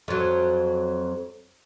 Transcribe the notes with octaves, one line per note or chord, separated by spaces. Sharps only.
F2 F#3